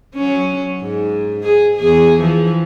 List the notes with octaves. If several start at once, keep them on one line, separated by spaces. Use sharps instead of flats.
F#3 C#4
G#2
G#4
E2 G#4
E3 F3